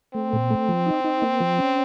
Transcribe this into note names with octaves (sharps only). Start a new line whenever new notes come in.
A3 C4
A#2
A3
F3
D#4
D#4
A#3
F3
C#4